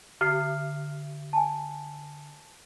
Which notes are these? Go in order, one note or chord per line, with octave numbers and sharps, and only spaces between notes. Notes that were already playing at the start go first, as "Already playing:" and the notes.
D3 F6 C7
G#5 A5